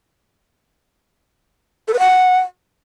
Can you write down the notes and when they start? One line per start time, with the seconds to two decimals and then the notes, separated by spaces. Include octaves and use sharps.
1.88 A4
1.93 B4
1.99 F#5